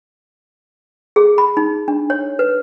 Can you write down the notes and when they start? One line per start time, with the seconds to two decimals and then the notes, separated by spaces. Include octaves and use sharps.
1.16 G#4
1.38 B5
1.57 D#4
1.88 D4
2.10 C#5
2.39 B4